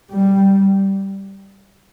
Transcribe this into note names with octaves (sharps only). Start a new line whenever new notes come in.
G3